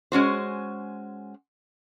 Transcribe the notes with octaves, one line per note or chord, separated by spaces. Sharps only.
G#3 C#4 F#4 C5